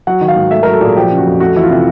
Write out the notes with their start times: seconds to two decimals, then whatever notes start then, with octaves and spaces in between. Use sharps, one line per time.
0.07 F#3 F#5
0.21 D#3
0.28 F5
0.36 G#2
0.51 A3 E5
0.63 F#3 A#4
0.73 A4
0.81 A#2 G#4
0.96 F3 G4
1.11 C#3
1.18 F#4
1.26 F2
1.40 A3 F#4
1.55 E3 E4
1.63 F4
1.70 C3